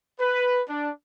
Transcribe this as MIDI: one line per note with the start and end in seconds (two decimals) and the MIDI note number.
0.21 0.61 71
0.69 0.91 62